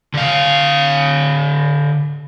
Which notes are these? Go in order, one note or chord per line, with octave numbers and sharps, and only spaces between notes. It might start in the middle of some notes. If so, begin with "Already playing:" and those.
D3 F5